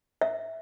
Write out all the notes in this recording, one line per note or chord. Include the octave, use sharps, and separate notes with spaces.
E5